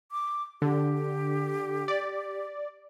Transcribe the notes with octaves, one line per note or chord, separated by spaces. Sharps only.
D6
D3 G4
D5